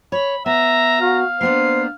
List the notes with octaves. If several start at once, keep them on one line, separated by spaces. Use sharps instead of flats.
C#5 B5
B3 E5 A#5
F#4 F5
A#3 B3 D4 C5 C7